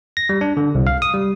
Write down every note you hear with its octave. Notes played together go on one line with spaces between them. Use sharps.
A#6
G3
D4
D3
C2
F5
D#6
G3